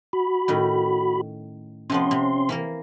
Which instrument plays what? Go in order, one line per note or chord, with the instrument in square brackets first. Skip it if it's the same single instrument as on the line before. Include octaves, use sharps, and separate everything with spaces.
[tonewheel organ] F#4 B5
[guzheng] A2 D#3 C#4
[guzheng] C3 F3 B3 [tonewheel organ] C#4 C6
[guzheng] C3
E3 A#3 A#4